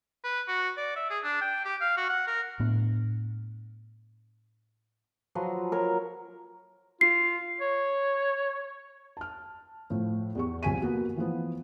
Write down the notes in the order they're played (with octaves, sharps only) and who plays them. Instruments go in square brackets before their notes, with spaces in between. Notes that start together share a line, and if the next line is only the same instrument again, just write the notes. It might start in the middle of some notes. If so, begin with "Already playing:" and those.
[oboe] B4
F#4
D5
E5
G#4
D4
G5
G4
F5
F#4
F#5
A#4
[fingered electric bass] A2 B3 D4
[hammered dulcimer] F3 F#3 B4 C6
F#4 A#4 C#5
[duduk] F4 [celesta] C7
[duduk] C#5
[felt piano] A5 F6
A2 F3
E2 G4 C#6
C2 F3 G#5 B6 D#7
A#3 B3 F#4
E3 F3 B3